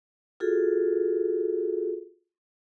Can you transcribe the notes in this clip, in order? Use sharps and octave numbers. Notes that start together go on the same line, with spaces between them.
F4 F#4 G#4 A4